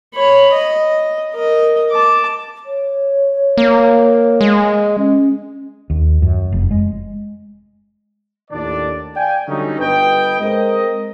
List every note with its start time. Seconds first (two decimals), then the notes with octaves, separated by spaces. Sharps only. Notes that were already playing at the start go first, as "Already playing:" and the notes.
0.14 C#5 B5
0.53 D#5
1.34 A#4 D#5
1.92 A5 D6
2.66 C#5
3.58 A#3
4.41 G#3
4.97 C#4
5.90 D#2
6.22 F#2
6.52 F1
6.71 G#3
8.51 D#2 A2 D#3 D4 D5
9.16 D5 F5 G5 G#5
9.46 D3 F#3 G3 A3 C#4 D#4
9.79 G1 B3 B4 D#5 G5
10.40 G#3 C4 A#4 D#5